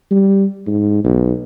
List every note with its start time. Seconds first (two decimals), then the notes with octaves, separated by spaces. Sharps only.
0.11 G3
0.67 G#2
1.04 B1